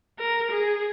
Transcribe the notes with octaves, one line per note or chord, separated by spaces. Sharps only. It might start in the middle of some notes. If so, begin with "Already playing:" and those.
A#4
G#4